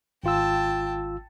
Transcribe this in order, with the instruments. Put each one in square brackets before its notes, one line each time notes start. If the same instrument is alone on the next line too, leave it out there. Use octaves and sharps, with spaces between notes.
[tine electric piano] G#1 F4 E6 [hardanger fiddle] G5 A5